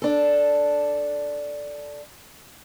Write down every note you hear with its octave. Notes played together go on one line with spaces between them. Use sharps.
D4 A4